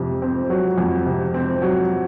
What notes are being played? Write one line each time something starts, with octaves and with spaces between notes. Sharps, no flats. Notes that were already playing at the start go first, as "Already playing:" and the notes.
Already playing: F2 C3
C4
F#3
F2
C3
C4
F#3